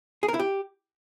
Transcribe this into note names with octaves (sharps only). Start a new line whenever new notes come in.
G#4
A#4
E4
G4